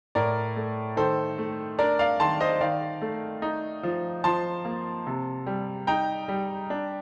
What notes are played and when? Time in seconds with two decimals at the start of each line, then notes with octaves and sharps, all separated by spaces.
0.15 A2 A#4 D5
0.56 A3
0.97 D#3 A4 C5
1.38 A3
1.79 D4 A#4 D5
1.99 D5 F5
2.20 D#3 A5 C6
2.40 C5 D#5
2.61 D#3 D5 F5
3.02 A3
3.42 D#4
3.83 F3
4.24 F3 A5 C6
4.65 A#3
5.07 C3
5.47 G3
5.87 D#4 G5 A#5
6.28 G3
6.70 D4